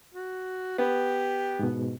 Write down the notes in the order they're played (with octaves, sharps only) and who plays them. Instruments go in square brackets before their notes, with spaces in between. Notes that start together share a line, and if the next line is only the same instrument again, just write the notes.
[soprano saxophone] F#4
[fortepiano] B3 [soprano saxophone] G4
[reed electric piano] G#2 B2